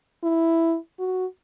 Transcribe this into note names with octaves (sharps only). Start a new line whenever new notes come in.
E4
F#4